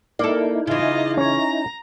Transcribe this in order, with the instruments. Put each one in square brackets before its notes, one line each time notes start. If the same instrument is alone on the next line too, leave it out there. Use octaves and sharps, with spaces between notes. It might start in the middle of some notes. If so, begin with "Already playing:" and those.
[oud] A#3 A4 [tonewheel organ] D#4 E4 [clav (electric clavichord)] D5
[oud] C#3 E3 [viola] F4 D#5
[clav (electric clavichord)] C#4 C#5 [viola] A#5